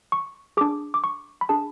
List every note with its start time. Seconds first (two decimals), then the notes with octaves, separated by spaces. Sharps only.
0.12 C#6
0.57 D4 G#4 D6
0.94 D6
1.04 C#6
1.41 B5
1.49 D4 G#4 A5